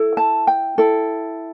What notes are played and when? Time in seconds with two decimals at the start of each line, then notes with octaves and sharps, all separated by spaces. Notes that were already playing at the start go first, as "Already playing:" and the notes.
Already playing: E4 A4
0.17 A5
0.47 G5
0.78 E4 A4